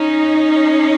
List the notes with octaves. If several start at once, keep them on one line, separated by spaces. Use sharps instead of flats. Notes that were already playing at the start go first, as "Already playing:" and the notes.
Already playing: C#4 D#4